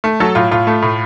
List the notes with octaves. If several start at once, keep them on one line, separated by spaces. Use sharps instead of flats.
A3
F#3 A4
A2 F4
A2 F4
A3
A2